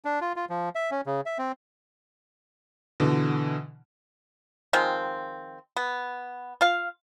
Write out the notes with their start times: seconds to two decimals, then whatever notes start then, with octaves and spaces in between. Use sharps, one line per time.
0.05 D4
0.21 F4
0.36 F4
0.50 F3
0.75 E5
0.91 C#4
1.06 C#3
1.26 E5
1.39 C4
3.00 B2 D3 E3
4.73 D#3 F3 G#3 C4
5.77 B3
6.61 F4 F5